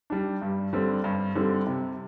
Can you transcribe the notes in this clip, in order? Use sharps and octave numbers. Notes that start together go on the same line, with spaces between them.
G3 D4
G2
D3 G3 C4
G2
D3 G3 C4
C3